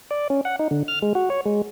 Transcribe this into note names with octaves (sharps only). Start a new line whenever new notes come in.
D5
C#4
F#5
D#4
D3
F6
G#3
F#4
C#5
G#3